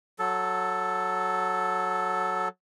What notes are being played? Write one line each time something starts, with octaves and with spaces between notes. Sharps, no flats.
F#3 A4